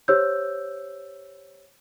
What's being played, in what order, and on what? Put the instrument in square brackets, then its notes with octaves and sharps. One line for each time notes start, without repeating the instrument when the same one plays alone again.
[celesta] G4 C5 C#5 E6 G6